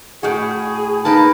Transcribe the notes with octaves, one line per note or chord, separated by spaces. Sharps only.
A2 F#4 G#4
A#3 D#4 B4 A5